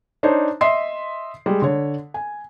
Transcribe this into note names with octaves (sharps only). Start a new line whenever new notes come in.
D4 D#4 C5 C#5
D#5 E5 C6 C7
G3 G#3
D3 C#5
G#5